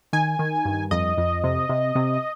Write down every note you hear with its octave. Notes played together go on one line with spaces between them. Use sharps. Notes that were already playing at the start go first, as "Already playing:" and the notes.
D#3 G#5
D#3
G2
F2 D#5
F2
C3
C3
C3